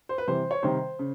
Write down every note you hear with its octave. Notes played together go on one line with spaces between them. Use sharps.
C5
B4
C3 E3 G3 C5
C#5
C3 D#3 G3 C5
C#3